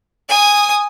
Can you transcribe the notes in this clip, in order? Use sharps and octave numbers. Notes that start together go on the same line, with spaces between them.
G#5 D#6